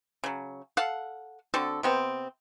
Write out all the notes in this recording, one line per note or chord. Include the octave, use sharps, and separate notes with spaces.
C#3 F#3
A4 F5 F#5
D3 C4 F#4 A4
C3 B3 C4